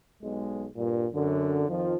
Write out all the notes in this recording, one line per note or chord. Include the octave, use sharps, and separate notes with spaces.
B1 G#3
G2 A#2
F#2 D3
F2 D#3 F3